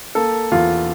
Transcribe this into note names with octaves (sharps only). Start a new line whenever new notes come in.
A#3 A4
E2 F4